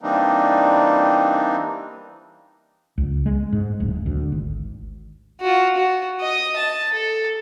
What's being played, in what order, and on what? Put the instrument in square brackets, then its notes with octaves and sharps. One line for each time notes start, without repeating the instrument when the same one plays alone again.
[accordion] E3 G3 A#3 C4 D4 D#4
[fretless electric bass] C#2
G#3
G#2
D1
D2
G#1
[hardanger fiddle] F4 F#4
F#4
D#5 D#6
A5
A4